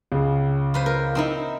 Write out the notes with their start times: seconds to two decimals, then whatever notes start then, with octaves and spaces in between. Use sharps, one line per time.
0.12 C#2 C#3
0.74 F4 B4 C5
0.86 A#4
1.15 C4 D#4 E4